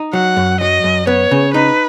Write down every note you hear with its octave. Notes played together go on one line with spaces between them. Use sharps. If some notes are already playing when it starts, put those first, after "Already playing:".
Already playing: D#4
F#3 F#5
F#2
F#3 D#5
F#2
B3 C#5
C#3
D#4 B4